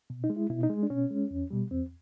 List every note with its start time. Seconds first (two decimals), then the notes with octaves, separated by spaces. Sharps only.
0.10 B2
0.24 D#4
0.30 G#3
0.36 E4
0.50 B2 E4
0.63 D#4
0.70 G#3
0.83 D4
0.90 B2 C#4
1.11 G#3
1.31 E2
1.51 B2 G3
1.71 E2 C4